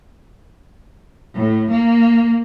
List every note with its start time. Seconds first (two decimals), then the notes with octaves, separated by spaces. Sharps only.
1.35 A2
1.70 A#3